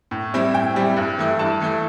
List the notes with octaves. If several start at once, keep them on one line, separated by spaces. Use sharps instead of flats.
A2
G3 C4 E4
A2 G5
G3 C4 E4
G2
E3 A3 E4
G2 A5
E3 A3 E4